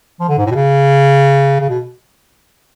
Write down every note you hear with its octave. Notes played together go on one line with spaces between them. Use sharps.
F3
D3
G#2
A2
B2
C#3
C#3
B2